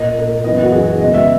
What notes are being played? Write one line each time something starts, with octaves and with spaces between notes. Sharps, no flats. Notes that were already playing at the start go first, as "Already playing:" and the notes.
Already playing: A#2 A#3 D#5
A#2 A#3
F#2 E3 B3 D#5
F#4
F#2 E3 B3 G#4
C#3 G#3 B3 D#5
E5